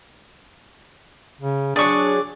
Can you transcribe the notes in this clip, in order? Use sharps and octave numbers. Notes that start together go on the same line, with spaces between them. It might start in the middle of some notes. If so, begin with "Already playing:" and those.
C#3
F#3 D4 G#4 D5 C#6